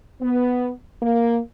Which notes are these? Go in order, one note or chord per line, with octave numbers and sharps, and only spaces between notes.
B3
A#3